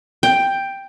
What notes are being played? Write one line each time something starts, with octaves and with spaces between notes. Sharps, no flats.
G5